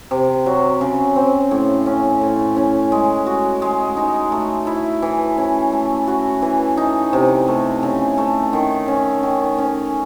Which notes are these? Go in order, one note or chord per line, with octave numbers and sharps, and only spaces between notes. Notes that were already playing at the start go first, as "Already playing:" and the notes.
C3
F#3
C#3
C4
A2
C#4
A2
C#4
G#3
F#4
G#3
D#4
A3
E4
E3
C#4
A3
F#4
E3
D#4
C3
A3
C#3
A3
D#3
C#4
D#3
C#4